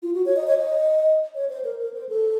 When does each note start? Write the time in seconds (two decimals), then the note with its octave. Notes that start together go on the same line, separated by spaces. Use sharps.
0.03 F4
0.14 F#4
0.26 C#5
0.36 D#5
0.47 C#5
0.58 D#5
1.35 C#5
1.49 C5
1.64 A#4
1.79 A#4
1.94 C5
2.09 A4